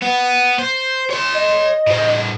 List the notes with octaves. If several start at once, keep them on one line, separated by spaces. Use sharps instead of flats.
B3
C5
C#5 C6
D#5
A2 C5